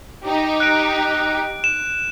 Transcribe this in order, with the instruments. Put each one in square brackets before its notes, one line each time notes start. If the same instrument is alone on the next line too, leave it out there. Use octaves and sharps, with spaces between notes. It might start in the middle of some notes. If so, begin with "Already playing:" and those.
[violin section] D#4 G4
[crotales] F#6 D7
E7